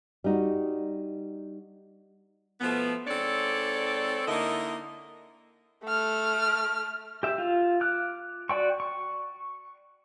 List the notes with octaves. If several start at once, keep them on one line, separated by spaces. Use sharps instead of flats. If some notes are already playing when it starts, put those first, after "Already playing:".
G3 D#4 F#4
B2 F3 A3 B3
G#2 C4 A4 C#5 D5
D3 A#3 D#4 E4 A#4 D#5
A3 F6
G4 E5
F4
D6 F6 F#6
F#4 D5 G5 C#6
C#6